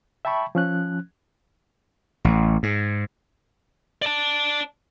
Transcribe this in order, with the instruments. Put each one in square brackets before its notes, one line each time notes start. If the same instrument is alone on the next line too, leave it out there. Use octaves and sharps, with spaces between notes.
[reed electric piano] E5 G5 A5 B5 C#6
F3 C#4 F#6
[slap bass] A1
G#2
[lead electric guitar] D5 A5